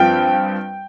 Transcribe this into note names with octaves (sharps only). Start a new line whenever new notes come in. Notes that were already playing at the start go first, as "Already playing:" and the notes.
Already playing: G2 F3 C4 G5